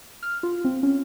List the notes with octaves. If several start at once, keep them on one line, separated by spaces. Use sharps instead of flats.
F6
F4
C4
C#4